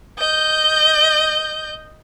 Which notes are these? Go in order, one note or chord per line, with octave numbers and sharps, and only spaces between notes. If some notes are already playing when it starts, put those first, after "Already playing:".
D#5 G6